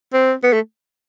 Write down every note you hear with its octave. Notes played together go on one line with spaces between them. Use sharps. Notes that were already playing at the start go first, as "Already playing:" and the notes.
C4
B3
A3